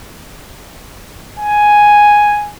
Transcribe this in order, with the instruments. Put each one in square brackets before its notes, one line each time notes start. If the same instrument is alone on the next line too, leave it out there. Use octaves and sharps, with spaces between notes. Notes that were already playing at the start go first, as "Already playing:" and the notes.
[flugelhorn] G#5